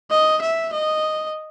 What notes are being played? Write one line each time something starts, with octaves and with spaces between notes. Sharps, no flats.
D#5
E5
D#5